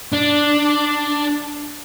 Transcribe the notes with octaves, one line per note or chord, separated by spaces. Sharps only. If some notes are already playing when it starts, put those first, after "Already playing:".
D4